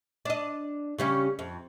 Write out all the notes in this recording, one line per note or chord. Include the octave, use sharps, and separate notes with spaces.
D4 D#5
C#3 G3 C#4
F2